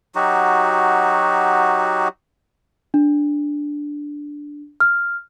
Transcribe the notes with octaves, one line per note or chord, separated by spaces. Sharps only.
F#3 D#4 F#4 G4
D4
F6